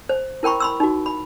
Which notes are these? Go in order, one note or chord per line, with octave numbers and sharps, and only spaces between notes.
C5
E4 A#4 G5 B5 C#6
B5 C6 E6
D#4 F#4
B5